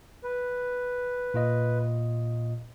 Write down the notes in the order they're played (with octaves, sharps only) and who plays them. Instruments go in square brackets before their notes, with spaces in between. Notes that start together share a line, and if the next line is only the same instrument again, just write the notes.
[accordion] B4
[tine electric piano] A#2 F4 D#5